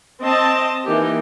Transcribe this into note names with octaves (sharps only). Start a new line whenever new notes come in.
C4 D#5 A5
E3 A#3 D#4 G4